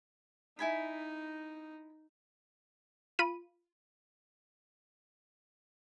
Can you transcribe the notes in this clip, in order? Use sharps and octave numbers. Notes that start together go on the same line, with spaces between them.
D#4 E4 G#5 B5
F4 B5 D#7